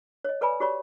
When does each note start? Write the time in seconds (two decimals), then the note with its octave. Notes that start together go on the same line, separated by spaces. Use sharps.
0.25 C#5 D#5
0.41 A4 B4 D5 G#5 B5
0.60 F#4 G4 C#5 D5 B5